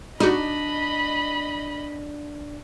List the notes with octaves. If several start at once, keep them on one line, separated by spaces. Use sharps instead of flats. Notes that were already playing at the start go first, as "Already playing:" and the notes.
D4 D#4 F#4 D#5 B5